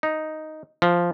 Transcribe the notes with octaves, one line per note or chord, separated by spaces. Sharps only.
D#4
F3